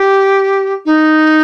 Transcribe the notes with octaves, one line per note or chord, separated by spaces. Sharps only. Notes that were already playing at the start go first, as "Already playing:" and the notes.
Already playing: G4
D#4